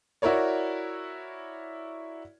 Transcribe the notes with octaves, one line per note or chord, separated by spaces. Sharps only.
E4 F#4 A#4 C#5 D5